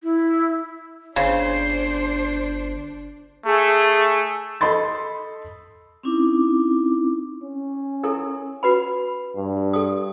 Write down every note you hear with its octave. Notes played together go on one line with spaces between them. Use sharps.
E4
G1 C#3 D4 C5
A3 G#4
A4 D#5 B5 C6 A6
C4 C#4 D#4 E4 D6
C#4
E4 A4 A#4
F#4 B4 B5
G2
A4 D#6